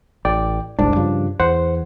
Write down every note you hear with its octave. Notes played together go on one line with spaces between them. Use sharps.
A1 D5 G5
F#1 C2 G#2 D4
G2 C#3 F3
E2 C5 F#5